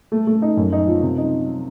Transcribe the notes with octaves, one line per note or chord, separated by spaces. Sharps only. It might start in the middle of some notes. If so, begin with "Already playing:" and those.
A3
A3
D#4
F#2
D#4
F3
C3
D#4